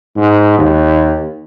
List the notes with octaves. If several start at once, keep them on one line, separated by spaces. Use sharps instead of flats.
G#2
D#2